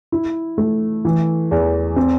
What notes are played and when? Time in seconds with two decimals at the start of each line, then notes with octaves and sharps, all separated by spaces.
0.12 E4
0.58 A3
1.05 E3
1.51 E2
1.96 C4